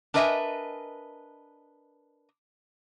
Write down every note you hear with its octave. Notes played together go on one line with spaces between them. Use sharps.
D4 A#4 B4 D#5 E5 G#5